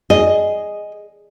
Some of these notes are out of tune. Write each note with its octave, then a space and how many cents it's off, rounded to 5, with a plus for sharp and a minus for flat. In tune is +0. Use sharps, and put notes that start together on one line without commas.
G#4 +0 D#5 +0